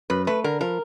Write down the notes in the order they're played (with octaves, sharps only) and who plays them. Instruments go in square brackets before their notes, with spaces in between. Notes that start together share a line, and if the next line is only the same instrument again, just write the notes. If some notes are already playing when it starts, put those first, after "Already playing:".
[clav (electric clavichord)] F#2 [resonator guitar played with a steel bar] B4
[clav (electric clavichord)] A3 [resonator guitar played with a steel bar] B4
[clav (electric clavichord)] D3 [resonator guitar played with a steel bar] A#4
[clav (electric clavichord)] F3 [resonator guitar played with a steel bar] A#4